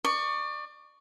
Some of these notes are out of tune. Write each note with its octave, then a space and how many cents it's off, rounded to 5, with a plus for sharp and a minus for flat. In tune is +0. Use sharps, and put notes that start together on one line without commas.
D5 +30 C#6 +15